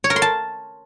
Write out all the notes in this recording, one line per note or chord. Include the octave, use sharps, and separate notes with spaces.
C#5
A#4
C6
A5